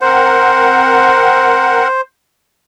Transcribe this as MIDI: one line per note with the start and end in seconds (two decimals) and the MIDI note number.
0.01 1.88 60
0.01 1.88 70
0.01 2.01 72
0.01 1.88 78